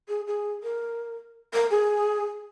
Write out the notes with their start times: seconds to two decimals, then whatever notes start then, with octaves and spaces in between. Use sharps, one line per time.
0.08 G#4
0.27 G#4
0.63 A#4
1.54 A#4
1.70 G#4